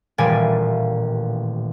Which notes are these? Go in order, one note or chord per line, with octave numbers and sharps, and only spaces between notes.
D#1 A1 A#2 G3 D5 G#5